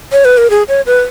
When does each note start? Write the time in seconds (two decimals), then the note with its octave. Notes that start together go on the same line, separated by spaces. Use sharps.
0.12 C#5
0.25 B4
0.37 A#4
0.50 G#4
0.68 C#5
0.86 B4